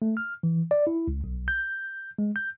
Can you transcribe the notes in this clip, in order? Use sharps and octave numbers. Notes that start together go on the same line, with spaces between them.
A3
F6
E3
D5
E4
C#2
B1
G6
G#3
G6